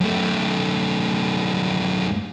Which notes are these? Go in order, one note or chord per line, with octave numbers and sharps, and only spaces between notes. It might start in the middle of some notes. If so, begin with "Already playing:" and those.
F#2 A3